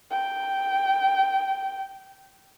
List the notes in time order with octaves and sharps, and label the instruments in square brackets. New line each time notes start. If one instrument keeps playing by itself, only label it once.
[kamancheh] G5